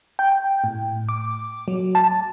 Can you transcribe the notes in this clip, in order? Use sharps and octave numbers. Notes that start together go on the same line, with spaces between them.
G5
A2
D6
F#3
A5